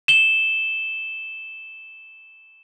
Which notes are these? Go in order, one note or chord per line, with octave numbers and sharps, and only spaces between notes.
E7 G7